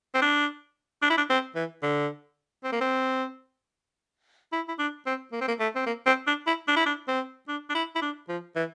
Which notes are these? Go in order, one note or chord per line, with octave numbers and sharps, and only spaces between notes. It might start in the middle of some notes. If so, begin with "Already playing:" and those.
C4
D4
D4
E4
D4
C4
E3
D3
C4
A#3
C4
E4
E4
D4
C4
A#3
C4
A#3
A3
C4
A#3
C4
D4
E4
D4
E4
D4
C4
D4
D4
E4
E4
D4
F3
E3